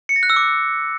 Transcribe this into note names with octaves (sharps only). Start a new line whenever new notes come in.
C#7
A#6
F#6
E6
D6